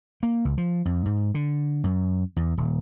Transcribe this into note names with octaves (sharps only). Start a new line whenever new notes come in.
A#3
C#2
F3
F2
G#2
D3
F#2
E2
D#1